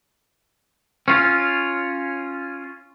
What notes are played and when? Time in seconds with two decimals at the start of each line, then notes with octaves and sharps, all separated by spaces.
1.08 C#4 F4